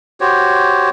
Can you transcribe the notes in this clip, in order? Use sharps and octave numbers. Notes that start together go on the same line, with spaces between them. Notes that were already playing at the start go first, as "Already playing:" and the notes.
F#4 G4 C5 C#5